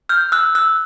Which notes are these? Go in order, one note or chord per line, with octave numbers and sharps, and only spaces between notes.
F6 G6
E6 F#6
E6 F#6